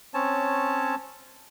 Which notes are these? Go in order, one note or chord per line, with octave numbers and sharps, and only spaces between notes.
C4 C#4 C#5 A5